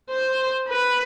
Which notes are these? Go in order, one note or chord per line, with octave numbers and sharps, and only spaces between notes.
C5
B4